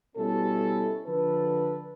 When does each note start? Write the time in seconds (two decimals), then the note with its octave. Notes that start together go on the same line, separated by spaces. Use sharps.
0.16 B2 G3 C#4 E4 A4
1.06 D3 F3 A4 B4